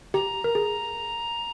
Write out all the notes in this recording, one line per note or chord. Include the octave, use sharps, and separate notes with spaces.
G4 A#5
A#4
G#4